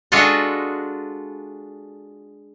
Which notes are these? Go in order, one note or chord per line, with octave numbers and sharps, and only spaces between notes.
G#3 D4 F4 F#4 A4 D#5